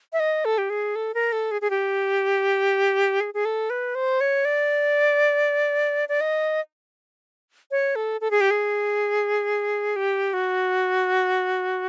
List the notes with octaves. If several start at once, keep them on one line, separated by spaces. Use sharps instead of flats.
E5
D#5
A4
G4
G#4
A4
A#4
A4
G#4
G#4
G4
G#4
G#4
A4
B4
C5
C#5
D5
D5
D#5
C#5
A4
A4
G#4
G4
G#4
G4
F#4